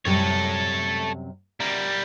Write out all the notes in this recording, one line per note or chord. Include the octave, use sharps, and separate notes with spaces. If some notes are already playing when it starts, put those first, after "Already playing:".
F#2 C3 G3 A4 C#5
G3 A#4